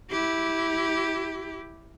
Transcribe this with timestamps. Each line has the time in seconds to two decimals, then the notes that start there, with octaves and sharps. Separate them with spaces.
0.10 E4 G4